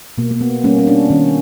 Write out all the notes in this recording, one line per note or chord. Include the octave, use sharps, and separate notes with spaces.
B2 A#3
A#3
B3
G3 A#3 C#4
C#4
D4
D#3 C#4